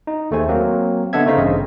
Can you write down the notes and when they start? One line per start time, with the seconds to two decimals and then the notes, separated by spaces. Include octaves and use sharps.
0.07 D#4
0.31 D#2 A3 G#4 C5 G#5
0.49 F#3 A#3 C4
1.13 D3 B3 A4 D#5 E5 G#6
1.26 C#3 A3 D#4 C5 F5 B6
1.37 A1 G2 C#3 C4 D#5